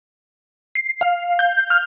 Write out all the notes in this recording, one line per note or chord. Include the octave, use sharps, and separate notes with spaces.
C7
F5
G6
F6